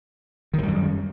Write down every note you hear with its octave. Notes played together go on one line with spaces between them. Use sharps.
F#2 D#3 F3 G3